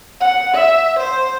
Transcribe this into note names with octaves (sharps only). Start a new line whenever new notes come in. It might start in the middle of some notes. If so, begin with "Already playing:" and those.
F#5
E5
C5